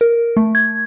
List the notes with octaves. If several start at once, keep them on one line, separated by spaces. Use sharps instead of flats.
A#4
A3
G#6